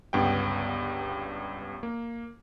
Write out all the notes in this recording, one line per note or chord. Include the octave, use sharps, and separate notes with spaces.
G1 C#2 G2 B3 F#5 G5
A#3